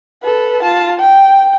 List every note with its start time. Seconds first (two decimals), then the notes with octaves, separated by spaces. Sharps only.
0.23 A4 B4
0.63 F4 A5
1.00 G5